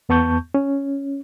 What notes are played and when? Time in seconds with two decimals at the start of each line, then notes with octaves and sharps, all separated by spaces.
0.09 E2 B3 A5 C#6 G6
0.54 C#4